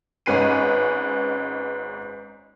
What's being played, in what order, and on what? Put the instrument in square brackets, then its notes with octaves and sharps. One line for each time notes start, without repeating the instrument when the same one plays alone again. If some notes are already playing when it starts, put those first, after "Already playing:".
[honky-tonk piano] G#1 G#2 C#4 B4 C7 D#7